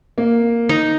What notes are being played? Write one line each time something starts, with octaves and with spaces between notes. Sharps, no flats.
A#3
D#4